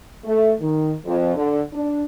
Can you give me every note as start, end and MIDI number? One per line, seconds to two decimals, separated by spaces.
0.24 0.52 57
0.60 0.92 51
1.05 1.33 41
1.35 1.60 50
1.73 2.03 62